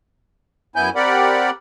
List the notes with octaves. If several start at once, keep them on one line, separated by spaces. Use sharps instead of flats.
F#2 B3 E4 G#5 G6
C4 G4 A#4 D5 F#5 B5